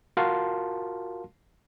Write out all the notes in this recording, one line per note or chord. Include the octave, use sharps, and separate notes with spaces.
F4 F#4 A#4 F5 A5 C6